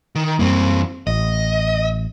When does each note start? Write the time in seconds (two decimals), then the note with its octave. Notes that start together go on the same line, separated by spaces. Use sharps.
0.15 D#3
0.39 F#2 E3 G3 A#3 C4
1.07 A1 D#5